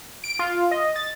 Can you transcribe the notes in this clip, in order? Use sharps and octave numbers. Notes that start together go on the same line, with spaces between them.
D7
F4
D#5
A6